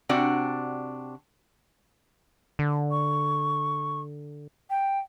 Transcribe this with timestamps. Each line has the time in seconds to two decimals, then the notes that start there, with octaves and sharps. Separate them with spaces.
0.09 C3 C4 D4 F#4 D5 F#5
2.59 D3
2.91 C#6
4.70 G5